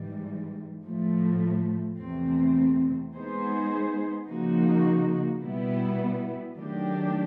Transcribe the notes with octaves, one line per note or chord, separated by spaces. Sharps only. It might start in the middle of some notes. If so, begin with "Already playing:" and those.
Already playing: G#2 E3 G3
A2 F3 A3
E2 C3 E3 A3 C4
G#3 B3 D#4 G#4 C5
C#3 F3 A#3 D#4 F#4
B2 G3 B3 E4
D#3 F#3 A3 D4 G4